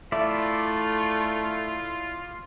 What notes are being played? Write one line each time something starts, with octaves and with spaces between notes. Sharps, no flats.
A3 E4 F4 D5 E5